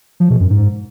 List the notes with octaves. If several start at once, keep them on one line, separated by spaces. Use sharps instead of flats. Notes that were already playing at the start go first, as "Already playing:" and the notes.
F3
B2
F#2
G#2